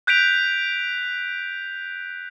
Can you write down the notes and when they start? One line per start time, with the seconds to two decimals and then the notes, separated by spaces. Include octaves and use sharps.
0.07 F#6 G6 B6 D7 F7